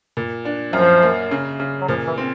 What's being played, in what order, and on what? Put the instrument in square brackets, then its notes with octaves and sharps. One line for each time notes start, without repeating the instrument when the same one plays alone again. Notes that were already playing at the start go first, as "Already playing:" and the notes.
[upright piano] A#2
D4
[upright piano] F#2 [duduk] F3
[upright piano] A#3
C#3
C#3
[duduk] F#3
[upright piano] A#2 [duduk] F3
[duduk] E3
[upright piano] C4